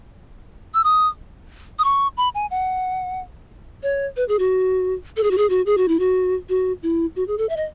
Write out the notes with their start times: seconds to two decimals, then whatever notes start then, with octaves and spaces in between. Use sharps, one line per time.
0.74 E6
0.84 D#6
1.79 D#6
1.84 C#6
2.17 B5
2.35 G#5
2.51 F#5
3.83 C#5
4.17 B4
4.28 G#4
4.39 F#4
5.17 A4
5.23 G#4
5.31 F#4
5.38 G#4
5.50 F#4
5.66 G#4
5.77 F#4
5.88 E4
5.99 F#4
6.49 F#4
6.83 E4
7.16 F#4
7.28 G#4
7.38 A4
7.49 E5
7.57 D#5